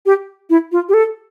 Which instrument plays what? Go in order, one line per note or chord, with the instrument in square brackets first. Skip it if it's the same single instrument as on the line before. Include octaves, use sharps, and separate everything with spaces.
[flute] G4
E4
F4
G4
A4